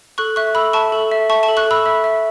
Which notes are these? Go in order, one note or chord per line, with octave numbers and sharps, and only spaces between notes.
A4 C#6 F#6
E5 C#6 F#6
A4 B5 E6
E5 A5 C#6
A4
E5
E5 A5 C#6
A5 C#6
A4
C#6 F#6
A4 B5 E6
E5
E5